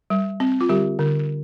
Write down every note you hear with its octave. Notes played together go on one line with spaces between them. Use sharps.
G3
C4
F4
D3 G3 G4
D3